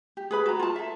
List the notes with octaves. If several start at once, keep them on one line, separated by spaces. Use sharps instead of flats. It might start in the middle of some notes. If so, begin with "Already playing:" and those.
G4
G#4 B4 B5
F#4 A#5
F4 A5
A4 E5